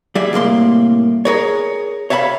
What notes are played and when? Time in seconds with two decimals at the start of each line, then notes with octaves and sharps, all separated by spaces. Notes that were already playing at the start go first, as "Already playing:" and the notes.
0.15 G3 G#4 D5 E5
0.33 C2 A2 A#3 C6
1.25 G#4 A#4 C#5
2.10 C#5 E5 F5 G5 B5